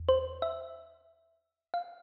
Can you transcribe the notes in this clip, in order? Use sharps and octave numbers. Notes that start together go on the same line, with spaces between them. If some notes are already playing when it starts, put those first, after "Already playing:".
Already playing: E2
C5
E5
F5